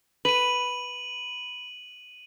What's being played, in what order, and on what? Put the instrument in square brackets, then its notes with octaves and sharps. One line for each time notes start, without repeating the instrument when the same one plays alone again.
[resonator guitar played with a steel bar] B4 [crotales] D#7 F#7